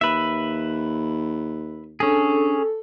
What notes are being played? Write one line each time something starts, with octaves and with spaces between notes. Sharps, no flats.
D#2 B4 E5
C#4 D4 G#4 A4